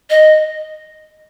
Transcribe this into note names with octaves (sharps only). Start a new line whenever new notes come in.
D#5